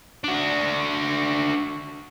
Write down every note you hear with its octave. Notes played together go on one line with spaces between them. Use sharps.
D4 F#4